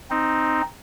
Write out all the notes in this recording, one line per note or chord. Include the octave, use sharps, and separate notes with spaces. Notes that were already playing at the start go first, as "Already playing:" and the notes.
C4 D#4